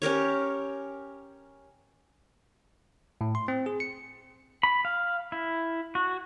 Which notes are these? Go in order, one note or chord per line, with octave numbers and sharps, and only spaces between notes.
C#4 G4 A#4 C#5
A2
C6
C4
G#4
C#7
B5
F5
E4
F#4